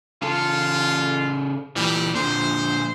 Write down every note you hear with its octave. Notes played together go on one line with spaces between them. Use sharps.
C#3 F4 A4
A#2 E3 G3
A#2 D3 C5